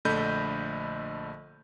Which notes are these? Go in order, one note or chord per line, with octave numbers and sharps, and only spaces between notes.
A#1 D3 A3 D#5 B5 G6